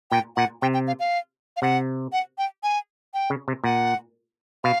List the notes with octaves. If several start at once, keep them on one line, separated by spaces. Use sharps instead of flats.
A#2 G5
A#2 F#5
C3 G5
G5
F5
F5
F5
C3 F#5
F#5
G5
G#5
G5
C#3
C3
A#2 F#5
B2 F5